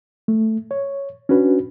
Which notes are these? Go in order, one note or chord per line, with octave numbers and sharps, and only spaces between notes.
A3
C#5
C#4 D4 F#4 B4